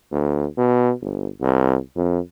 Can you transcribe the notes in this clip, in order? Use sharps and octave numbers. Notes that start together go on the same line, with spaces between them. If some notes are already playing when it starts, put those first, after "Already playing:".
D2
B2
G1
C2
F2